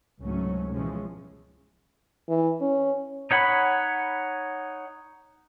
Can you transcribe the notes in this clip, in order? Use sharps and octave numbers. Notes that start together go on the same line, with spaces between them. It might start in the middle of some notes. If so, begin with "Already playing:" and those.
C#2 G#2 C3 F#3 A3 C#4
B2 E3 F3 G#3 C#4
E3
C#4
D#4 C#5 F#5 B5